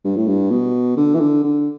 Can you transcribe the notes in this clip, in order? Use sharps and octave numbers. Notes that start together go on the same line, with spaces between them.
G2
A2
G2
B2
D3
E3
D3
D3